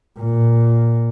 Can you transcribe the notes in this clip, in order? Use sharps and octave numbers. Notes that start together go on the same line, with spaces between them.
A#2